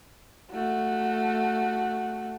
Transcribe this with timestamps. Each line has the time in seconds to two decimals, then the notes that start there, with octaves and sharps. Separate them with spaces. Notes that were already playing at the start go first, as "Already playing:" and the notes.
0.52 A3 F#4